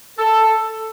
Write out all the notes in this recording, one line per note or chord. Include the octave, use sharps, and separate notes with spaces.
A4